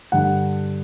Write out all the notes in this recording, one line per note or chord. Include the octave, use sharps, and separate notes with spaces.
G2 D3 F#5